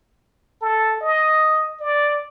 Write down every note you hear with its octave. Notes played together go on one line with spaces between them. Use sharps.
A4
D#5
D5